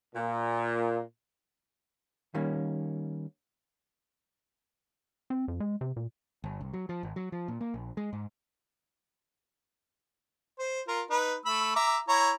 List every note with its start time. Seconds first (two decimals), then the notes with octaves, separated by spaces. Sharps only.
0.15 A#2
2.34 D#3 G3 A#3 C#4
5.30 C4
5.48 F2
5.60 G#3
5.81 C3
5.96 A#2
6.44 G1
6.61 C2
6.73 F#3
6.89 F3
7.03 G#1
7.16 F#3
7.32 F3
7.48 A#2
7.61 A#3
7.74 A#1
7.97 G#3
8.13 G#2
10.59 C5
10.88 F4 A#4
11.10 D#4 B4
11.45 A3 B5 E6
11.76 E5 A#5 D6
12.09 E4 C#5 A#5